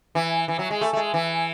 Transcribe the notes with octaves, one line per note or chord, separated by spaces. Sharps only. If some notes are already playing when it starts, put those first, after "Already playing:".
E3
E3
F#3
G#3
A3
A3
G#3
E3